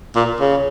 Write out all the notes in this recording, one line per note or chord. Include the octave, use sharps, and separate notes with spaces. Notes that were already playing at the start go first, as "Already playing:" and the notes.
A#2
C#3